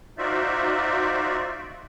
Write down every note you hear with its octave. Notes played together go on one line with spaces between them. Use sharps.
D#4 F4 F#4 C5 D5 E5